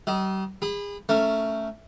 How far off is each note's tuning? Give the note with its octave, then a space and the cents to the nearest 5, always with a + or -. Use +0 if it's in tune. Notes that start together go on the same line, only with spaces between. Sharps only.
G3 -40 D#5 +10
G#4 -35 B5 +0
A3 +5 C#4 +10 A#4 -15